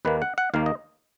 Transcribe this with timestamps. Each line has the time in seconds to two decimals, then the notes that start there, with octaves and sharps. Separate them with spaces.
0.05 D#2 D#3 A#3 B4
0.22 F#5
0.38 F#5
0.54 D#2 D#3 A#3 F5
0.66 D#5